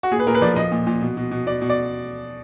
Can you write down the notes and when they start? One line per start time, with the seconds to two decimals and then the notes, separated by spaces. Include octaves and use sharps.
0.03 F#4
0.12 A#2 G#4
0.19 B4
0.27 A#2 A#4
0.35 B4
0.42 F3 D5
0.56 F3 D#5
0.72 A#2
0.87 A#2
1.01 B2
1.17 B2
1.31 B2
1.47 B2 D5
1.62 B2
1.70 D5